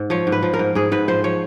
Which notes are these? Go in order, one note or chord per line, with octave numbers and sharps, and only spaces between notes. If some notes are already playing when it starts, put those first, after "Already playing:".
Already playing: G#2
F3 C#5
G#2
B4
F3
A#4
G#2
G#2 G#4
G#2 B4
F3 C5
F3 C#5